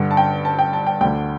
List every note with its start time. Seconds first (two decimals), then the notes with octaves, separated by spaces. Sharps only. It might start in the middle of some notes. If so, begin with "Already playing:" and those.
Already playing: G2 D3
0.11 A5
0.17 G5
0.45 A5
0.59 G5
0.73 A5
0.87 G5
1.01 D2 D3 G5